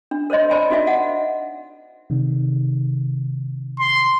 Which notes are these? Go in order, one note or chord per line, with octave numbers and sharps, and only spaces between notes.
D4
A#4 C5 C#5 D#5 C6
A#4 C5 D5 G#5 A5 B5
D4 D#4 F#4 D#5 E5 G#5
D#5 F5 F#5
C3 D#3
C6